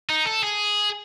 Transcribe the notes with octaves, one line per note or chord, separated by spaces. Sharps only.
D#4
A4
G#4